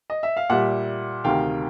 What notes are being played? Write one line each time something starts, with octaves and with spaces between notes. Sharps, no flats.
D#5
E5
F5
A#2 G3 E5 F#5
D2 C3 D#3 F5 G5